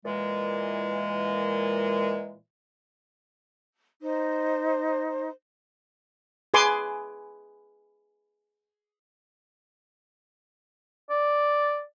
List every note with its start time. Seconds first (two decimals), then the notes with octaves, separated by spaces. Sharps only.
0.05 A#2 E3 G#3
4.02 D#4 C5
6.54 G#4 B4 G#5 C6 D6
11.10 D5